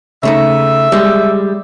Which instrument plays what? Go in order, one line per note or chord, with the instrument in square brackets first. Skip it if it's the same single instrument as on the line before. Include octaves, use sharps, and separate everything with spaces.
[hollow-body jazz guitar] C#3 A3 D#4 [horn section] E5
[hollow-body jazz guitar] G3 G#3